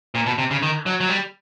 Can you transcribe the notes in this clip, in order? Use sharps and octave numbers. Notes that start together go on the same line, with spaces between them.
A#2
B2
C3
C#3
D#3
F#3
F#3
G3